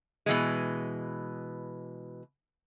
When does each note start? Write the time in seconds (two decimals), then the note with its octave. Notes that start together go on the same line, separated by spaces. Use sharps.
0.26 B2 E3 G#3